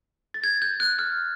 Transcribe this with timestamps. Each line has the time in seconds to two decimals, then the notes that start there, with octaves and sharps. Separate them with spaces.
0.34 A6
0.44 G#6
0.62 G6
0.80 F#6
0.99 F6